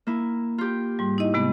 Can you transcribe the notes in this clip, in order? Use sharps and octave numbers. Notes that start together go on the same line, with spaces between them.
A#3 E4
F4 G4
G#2 G3
D#4 E4 D#5
C3 G#3 B3